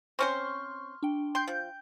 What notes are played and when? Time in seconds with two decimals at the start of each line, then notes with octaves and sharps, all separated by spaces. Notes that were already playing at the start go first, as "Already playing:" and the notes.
0.19 C4 C#4 C5 C6 C#6 F6
1.03 D4 G5
1.35 G5 C6 G6
1.48 F3